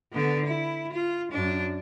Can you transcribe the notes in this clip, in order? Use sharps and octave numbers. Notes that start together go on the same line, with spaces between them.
D3 B3
E4
F4
F#2 D4